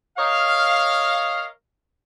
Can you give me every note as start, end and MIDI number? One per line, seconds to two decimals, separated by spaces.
0.18 1.45 70
0.18 1.45 73
0.18 1.45 75
0.18 1.45 77